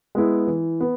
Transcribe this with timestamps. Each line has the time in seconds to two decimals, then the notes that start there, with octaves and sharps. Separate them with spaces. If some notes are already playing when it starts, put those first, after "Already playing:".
0.15 G#3 B3 E4
0.47 E3
0.80 B3